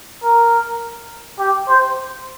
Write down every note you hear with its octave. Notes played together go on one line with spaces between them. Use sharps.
A#4
G4
C5